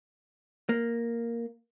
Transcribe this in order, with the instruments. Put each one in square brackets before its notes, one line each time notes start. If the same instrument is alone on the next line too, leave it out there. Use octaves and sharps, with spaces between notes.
[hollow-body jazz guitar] A#3